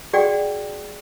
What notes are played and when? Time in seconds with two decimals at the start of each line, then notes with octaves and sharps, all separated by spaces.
0.13 F#4 G#4 D5 F#5 G5